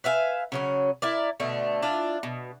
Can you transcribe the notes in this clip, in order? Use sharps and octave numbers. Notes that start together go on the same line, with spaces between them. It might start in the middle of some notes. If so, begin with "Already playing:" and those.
B4 E5 F5 G#5
C#3 F#3 C#4
E4 A#4 D5
B2 D3 A3 D5
D4 E4 F4
B2